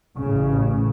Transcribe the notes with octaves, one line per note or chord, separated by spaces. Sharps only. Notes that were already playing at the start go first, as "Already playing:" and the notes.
A1 A2 C#3